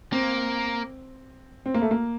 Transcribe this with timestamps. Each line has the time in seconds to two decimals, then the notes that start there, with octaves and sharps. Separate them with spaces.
0.12 A#3 C4
1.66 C4
1.74 A#3
1.82 A3
1.91 A#3